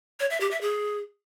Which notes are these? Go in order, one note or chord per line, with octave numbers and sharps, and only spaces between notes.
C#5
E5
G4
E5
G#4